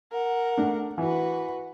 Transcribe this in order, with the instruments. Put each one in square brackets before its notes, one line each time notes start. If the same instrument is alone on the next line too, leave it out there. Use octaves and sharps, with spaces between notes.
[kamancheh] A#4 F#5
[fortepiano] A3 D4
[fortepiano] E3 [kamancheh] F#4 B4